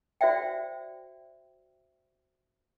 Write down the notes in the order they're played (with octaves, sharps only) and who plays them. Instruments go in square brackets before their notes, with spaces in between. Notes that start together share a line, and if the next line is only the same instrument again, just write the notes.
[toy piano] F#4 C5 D5 E5 G5